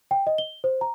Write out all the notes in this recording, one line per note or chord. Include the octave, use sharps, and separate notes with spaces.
G5
D#5
G7
C5
A#5